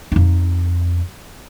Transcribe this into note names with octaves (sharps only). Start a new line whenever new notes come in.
F2 D#4